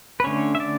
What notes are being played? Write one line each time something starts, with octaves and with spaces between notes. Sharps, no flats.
B4
D3 A3 C#4 C#5
E5
D5